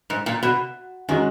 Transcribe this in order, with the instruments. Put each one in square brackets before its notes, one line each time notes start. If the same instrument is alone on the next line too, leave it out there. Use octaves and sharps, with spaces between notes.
[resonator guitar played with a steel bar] G#2
A#2
B2
[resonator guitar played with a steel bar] D#3 [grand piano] G#3 C#4 F#4